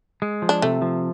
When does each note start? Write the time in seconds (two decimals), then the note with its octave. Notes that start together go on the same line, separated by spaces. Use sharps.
0.22 G#3
0.42 F3
0.49 D4
0.62 C3 A3
0.82 F3